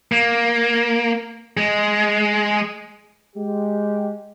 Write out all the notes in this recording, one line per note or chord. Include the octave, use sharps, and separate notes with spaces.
A#3
G#3
G#3 G4